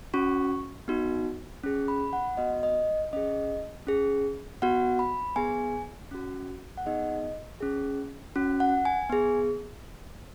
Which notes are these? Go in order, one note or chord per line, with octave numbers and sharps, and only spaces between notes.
C#4 F#4 C#6
B3 D#4 F#4
C#4 G#4
B5
F#5
B3 F#4 D#5
D#5
C#4 G#4 D#5
C#4 G#4
B3 F#4 F#5
B5
B3 G#4 G#5
C#4 F#4
F#5
B3 D#4 G#4 D#5
C#4 G#4
C#4 F#4
F#5
G#5
B3 G#4